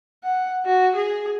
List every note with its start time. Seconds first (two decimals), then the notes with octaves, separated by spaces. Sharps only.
0.23 F#5
0.65 F#4
0.96 G#4